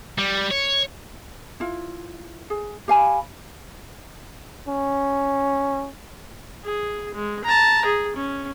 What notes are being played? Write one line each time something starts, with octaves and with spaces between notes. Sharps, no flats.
G3
C#5
E4 F4
G#4
G4 F5 G#5 B5
C#4
G#4
G#3
A5 A#5
G#4
C#4